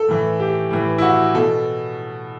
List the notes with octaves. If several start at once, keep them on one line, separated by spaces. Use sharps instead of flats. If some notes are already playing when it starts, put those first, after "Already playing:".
Already playing: A4
A2 E3
G4
A2 E3
E4
F#4
B2 A4